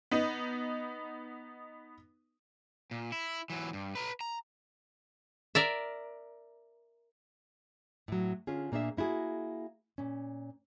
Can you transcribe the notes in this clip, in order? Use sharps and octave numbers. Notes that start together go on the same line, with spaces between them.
B3 D#4
A#2
E4
E3 F#3
G2
B4 A#5
A#5
A#4 D5 E5
A2 F#3
D3 C#4 F4 G#4
A#2 A#3 D4 G#4 E5
A#3 E4 F#4 G#4
A#2 C#4